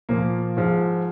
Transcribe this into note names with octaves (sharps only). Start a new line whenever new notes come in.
A#2 F3 A#3
G#2 F3